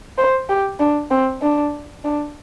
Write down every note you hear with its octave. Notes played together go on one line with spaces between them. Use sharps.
C5
G4
D4
C4
D4
D4